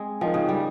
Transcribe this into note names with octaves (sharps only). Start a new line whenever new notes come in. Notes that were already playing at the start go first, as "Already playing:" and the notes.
Already playing: G#3 C4
F3 D#4 A#4 D#5 G5
C#3
G3